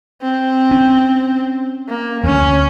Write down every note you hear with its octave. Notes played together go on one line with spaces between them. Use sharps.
C4
C#4
A#3
D2 C#4